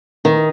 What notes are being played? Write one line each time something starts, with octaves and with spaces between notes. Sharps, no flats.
D#3